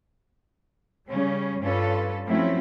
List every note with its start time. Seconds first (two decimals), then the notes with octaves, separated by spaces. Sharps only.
1.07 C#3 G3 C#4
1.62 G2 C#4 F4 A4 B4
2.25 F3 F#3 A3 C4 C#4 E4